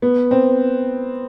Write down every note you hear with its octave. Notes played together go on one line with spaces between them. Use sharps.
B3
C4